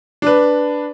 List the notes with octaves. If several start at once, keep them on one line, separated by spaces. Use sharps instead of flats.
D4 B4